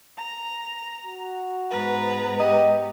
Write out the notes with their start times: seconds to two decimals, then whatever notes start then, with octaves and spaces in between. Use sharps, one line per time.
0.17 A#5
1.06 F#4
1.70 G#2 B3 B4 A#5
2.40 G4 D#5